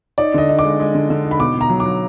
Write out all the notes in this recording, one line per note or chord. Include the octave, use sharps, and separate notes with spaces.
D#4 D5
D3 D#5
D#4
D6
G#3
G#3
D3
D3
D#4
B5
B2 D6
B2
A#5
F#3
D6
F#3